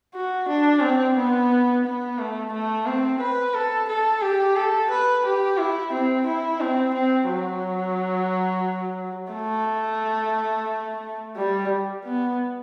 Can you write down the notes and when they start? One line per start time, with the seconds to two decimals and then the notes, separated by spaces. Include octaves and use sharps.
0.14 F#4
0.48 D4
0.82 C4
1.16 B3
1.85 B3
2.19 A3
2.53 A3
2.87 C4
3.21 B4
3.54 A4
3.89 A4
4.22 G4
4.56 A4
4.90 B4
5.25 G4
5.58 E4
5.92 C4
6.27 E4
6.60 C4
6.94 C4
7.28 F#3
9.32 A3
11.36 G3
12.04 B3